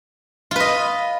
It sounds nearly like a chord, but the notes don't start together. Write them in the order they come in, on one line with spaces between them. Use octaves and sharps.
F4 B4 D#5